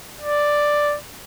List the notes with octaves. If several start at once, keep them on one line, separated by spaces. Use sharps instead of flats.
D5